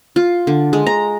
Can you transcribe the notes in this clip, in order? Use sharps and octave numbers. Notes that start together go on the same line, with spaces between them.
F4
D3
G#3
A#5